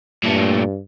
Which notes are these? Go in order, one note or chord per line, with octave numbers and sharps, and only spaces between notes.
G2 A#2 A3